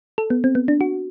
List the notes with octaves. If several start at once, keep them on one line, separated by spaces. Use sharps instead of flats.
A4
B3
C4
B3
D4
F#4